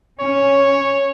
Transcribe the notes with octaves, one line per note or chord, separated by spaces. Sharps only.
C#4 C#5